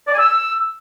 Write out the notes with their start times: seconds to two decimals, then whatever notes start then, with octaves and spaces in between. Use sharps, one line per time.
0.08 D5
0.13 G#5
0.19 E6